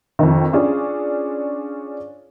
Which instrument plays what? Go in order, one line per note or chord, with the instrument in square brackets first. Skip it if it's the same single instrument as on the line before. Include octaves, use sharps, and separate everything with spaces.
[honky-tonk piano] F2 D#3
C#4 D4 F4 G#4